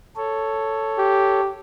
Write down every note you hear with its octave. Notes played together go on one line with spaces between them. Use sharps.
A4 C#5
G4